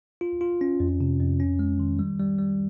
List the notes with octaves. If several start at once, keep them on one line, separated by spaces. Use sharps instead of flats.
F4
F4
C#4
F2
C3
F2
C#4
G#3
D#3
G3
G3
G3